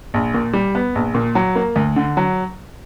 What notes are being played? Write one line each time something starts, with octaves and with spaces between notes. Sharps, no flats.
A#1
A#2
G3
B3
A#1
A#2
F#3
A#3
D2
D3
F#3